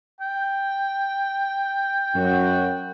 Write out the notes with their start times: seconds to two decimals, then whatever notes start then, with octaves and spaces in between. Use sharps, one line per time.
0.21 G5
2.15 F#2 F#4